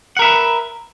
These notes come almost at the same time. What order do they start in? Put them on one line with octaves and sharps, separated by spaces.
F#5 A#4 E5 B4